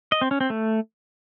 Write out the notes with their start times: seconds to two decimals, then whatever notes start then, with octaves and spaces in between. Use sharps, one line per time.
0.12 D#5
0.21 C4
0.31 C#4
0.41 C4
0.50 A3